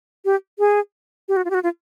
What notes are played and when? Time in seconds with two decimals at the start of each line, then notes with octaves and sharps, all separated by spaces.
0.25 G4
0.59 G#4
1.28 G4
1.37 F#4
1.45 F4
1.50 G4
1.54 F#4
1.63 F4